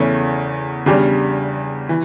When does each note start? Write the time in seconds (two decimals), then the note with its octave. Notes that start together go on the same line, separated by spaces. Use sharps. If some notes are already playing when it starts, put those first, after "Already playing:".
Already playing: E2 C#3 E3 A3 C#4
0.86 E2 C#3 G3 D4 G4
1.89 E3